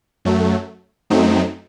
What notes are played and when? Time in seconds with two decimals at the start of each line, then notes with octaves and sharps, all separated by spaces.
0.25 F#2 F#3 A3
1.10 F#2 F#3 A3 C4 D#4